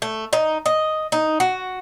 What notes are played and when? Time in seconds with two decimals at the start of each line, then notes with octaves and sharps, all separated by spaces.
0.02 A3
0.33 D#4
0.66 D#5
1.12 D#4
1.40 F#4